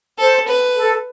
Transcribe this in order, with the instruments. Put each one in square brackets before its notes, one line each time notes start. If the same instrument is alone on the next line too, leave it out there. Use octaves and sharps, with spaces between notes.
[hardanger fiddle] A4 [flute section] C5
[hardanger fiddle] B4
[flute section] A4